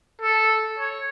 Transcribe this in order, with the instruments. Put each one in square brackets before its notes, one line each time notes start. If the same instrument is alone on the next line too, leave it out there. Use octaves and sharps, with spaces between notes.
[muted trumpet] A4
C#5